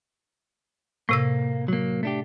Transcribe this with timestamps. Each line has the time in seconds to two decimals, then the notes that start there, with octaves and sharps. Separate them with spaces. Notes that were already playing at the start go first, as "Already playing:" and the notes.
1.09 A2 C3 A#3 E6
1.68 F#3 A#3
2.03 A3 D4 G4